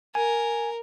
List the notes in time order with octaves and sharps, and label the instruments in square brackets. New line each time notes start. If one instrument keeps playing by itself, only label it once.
[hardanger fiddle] A#4 [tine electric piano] G#5